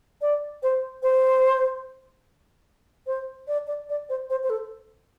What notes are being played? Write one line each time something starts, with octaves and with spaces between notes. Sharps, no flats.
D5
C5
C5
C5
D5
D5
D5
C5
C5
C5
A4